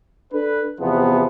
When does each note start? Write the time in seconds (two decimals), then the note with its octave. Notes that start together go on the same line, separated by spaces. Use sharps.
0.33 D4 A4 B4
0.80 E2 C3 F3 B3